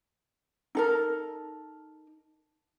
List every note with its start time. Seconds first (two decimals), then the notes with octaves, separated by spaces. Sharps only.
0.75 D#4 A4 A#4